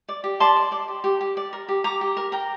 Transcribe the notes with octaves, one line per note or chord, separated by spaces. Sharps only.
D5
G4
D5 A5 C6
D5
D5
G4
G4
G4
D5
A#4
G4
G4 A#5 D6
G4
A#4
A#4 G5 A#5